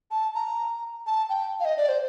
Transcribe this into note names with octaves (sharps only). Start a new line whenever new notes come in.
A5
A#5
A5
G5
F5
D#5
D5
C5